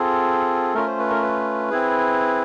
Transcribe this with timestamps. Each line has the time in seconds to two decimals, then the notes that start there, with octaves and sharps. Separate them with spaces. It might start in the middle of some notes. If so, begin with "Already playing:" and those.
Already playing: C4 F4 G#4 A4
0.75 A3 C#4 F4 A#4
0.87 C5
0.99 B4
1.10 A#4
1.22 B4
1.71 C4 E4 G#4